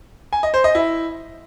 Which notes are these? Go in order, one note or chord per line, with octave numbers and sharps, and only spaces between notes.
G#5
D#5
C5
D#5
E4